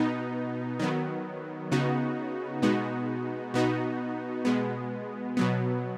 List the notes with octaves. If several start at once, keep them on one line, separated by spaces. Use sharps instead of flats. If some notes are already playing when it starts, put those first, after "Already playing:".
Already playing: B2 B3 D#4
D#3 F#3 B3
C#3 B3 D#4 F#4
B2 G#3 B3 D#4 F#4
B2 B3 D#4 F#4
B2 G#3 B3
B2 F#3 B3